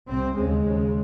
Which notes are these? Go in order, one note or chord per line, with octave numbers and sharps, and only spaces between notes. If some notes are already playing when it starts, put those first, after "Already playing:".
C2 C3 C4
D#2 C#3 G#3
D#2 C#3